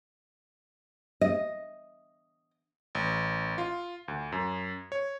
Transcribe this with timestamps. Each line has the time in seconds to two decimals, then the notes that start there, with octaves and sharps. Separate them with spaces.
1.21 D#5
2.95 A1
3.58 F4
4.08 D2
4.32 F#2
4.92 C#5